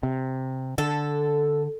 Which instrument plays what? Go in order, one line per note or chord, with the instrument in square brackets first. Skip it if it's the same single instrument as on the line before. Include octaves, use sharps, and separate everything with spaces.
[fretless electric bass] C3
[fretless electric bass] D3 [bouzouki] A4